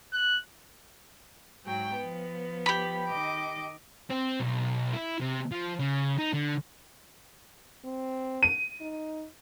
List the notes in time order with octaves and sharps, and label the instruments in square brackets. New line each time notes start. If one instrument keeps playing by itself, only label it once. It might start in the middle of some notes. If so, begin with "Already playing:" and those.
[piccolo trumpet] F#6
[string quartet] G#2 F#3 G5
F3 B3
[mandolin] G4 B5
[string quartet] D#3 D#5 D6
[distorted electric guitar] C4
B1
E4
C3
F3
C#3
D#4
D3
[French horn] C4
[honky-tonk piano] D#7
[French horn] D#4